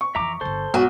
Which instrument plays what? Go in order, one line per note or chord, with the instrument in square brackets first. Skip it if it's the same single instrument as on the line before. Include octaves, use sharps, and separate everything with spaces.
[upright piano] C#6
[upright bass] F2 E3 [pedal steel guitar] E5 A#5 D6
[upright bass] G1 D3 [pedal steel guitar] A4 C5
[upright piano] B1 [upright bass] G#2 [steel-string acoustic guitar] F#4